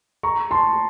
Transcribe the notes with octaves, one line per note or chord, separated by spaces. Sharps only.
A#5 C#6
A5 C6